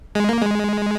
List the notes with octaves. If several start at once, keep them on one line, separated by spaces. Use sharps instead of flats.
G#3
A#3
G#3